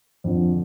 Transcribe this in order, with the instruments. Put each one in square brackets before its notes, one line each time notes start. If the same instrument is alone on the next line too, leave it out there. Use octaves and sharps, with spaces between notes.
[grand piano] F2 D3 F3